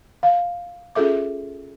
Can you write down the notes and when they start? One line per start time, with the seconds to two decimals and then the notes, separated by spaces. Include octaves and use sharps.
0.23 F5
0.95 C#4 F4 G#4 A4 E5 D6